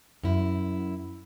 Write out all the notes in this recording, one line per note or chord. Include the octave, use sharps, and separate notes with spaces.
F#2 E4